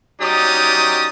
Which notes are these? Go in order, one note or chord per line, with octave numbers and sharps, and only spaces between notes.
F#3 C#4 D#4 G4 D5 D#6